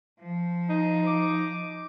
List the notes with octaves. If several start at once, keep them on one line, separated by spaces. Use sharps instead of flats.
F3
D#4
D6